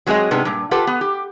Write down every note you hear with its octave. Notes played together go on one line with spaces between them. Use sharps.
F#3 G#3 C4 G4 G#4 D#5
G#2 C3 G#3 B3 D4
G2 A#2
F4 G4 A4 B4 F#5
B3
G4